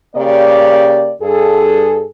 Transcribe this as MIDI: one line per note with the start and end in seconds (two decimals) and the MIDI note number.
0.16 1.13 49
0.16 1.13 58
0.16 1.13 67
0.16 1.13 74
1.22 2.05 43
1.22 2.05 68
1.22 2.05 69